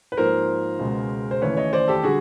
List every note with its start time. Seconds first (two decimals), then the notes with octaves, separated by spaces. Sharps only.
0.12 B4
0.17 G#2 F3 A#3 A#4 C5
0.79 C#2 B2 G#3
1.31 C5
1.41 D#2 C#3 E3 A3 B4 C#5
1.57 C#5 D#5
1.73 C5 D5
1.88 G4 A4
2.03 D3 G3 F#4 G#4